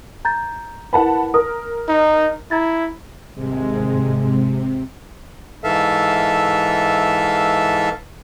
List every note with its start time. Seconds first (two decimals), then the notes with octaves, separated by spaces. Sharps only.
0.25 A#5 G6 A6
0.93 E4 A#4 B4 F#5 A5 B5
1.34 A#4 D#6
1.88 D#4
2.51 E4 A#5 G#6 A6
3.35 G#1 G#2 C3 G#3
5.64 G#2 E3 A4 E5 F5